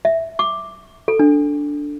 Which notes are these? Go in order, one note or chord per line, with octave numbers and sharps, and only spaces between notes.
E5
D6
A4
D4